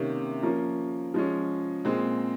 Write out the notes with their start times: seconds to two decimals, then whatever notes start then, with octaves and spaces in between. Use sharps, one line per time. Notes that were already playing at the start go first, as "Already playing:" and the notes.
Already playing: C3 D#3 A#3 C#4
0.43 F3 A#3 C#4 A#5
1.14 F3 G#3 C#4
1.85 A#2 G#3 C4